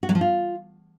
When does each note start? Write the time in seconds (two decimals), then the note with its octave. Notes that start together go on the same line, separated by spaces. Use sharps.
0.03 F#4
0.09 F#3
0.15 F3
0.21 F4